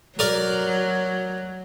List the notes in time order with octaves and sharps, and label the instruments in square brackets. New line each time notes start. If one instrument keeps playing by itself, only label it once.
[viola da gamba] F#3 [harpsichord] A#4 D5